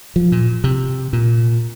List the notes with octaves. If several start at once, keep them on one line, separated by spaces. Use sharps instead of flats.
F3
A#2
C3
A#2